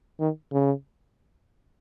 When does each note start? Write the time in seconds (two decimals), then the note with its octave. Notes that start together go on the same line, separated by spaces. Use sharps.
0.20 D#3
0.52 C#3